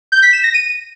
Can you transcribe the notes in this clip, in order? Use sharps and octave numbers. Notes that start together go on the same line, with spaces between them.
G6
B6
E7
A#6
D#7